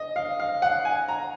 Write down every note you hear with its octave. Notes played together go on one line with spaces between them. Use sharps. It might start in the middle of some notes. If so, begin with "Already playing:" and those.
Already playing: D#5
F5
F5
F#5
G#5
A#5